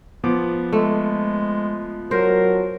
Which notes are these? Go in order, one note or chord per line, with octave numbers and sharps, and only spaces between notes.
F3 B3 D6
G#3 A3
F#3 A#4 C5